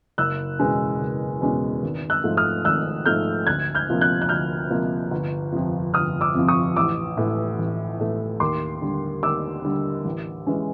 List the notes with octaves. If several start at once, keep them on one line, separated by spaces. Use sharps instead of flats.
F#1 E6 F#6
E2 B2 G#3 C#4
F#1
E2 B2 G#3 C#4
G#1
E6 F#6
G#2 F3 A3
D#6 F6
G#1 E6 F#6
G#2 F3 A3 F6 G6
D2 F#6 G#6
F6 G6
C3 F3 A#3
F#6 G#6
F#6
D2 F6 G6
C3 F3 A#3
G1
F2 C3 F3
G1 D#6 F6
D6 E6
F2 C3 F3
C#6 D#6
A1 D6 E6
A2 E3 A3
A1
A2 E3 A3
D#2 C6 D6
D3 G3
D#2 D6 E6
D3 G3
A1
E3 G#3 C#4